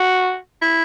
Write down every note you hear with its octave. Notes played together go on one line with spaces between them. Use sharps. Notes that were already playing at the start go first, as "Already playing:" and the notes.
Already playing: F#4
E4